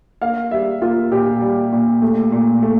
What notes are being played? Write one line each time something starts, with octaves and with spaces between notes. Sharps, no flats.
A#3 F5
G3 E5
A#3 F4
A#2 G4
G3
A#2
A3
A#2
A3